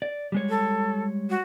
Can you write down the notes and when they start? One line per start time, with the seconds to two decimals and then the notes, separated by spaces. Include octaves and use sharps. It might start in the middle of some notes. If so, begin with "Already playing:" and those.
0.02 D5
0.32 G3 G#3 C#5
0.49 A4
1.30 F#4